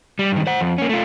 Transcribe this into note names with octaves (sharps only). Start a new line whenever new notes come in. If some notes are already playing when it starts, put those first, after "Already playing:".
G3
G2 D#3
C5 F#5
F2
A#3 C#4
A3 F4